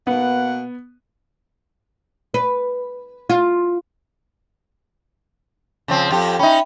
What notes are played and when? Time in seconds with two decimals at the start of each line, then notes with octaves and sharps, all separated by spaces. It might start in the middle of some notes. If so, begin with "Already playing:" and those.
0.07 B2 A#3 B3 F#5
2.34 B4
3.30 F4
5.88 C#3 F3 C4
6.11 F2 G4
6.39 C#4 D#4 E5 G5 B5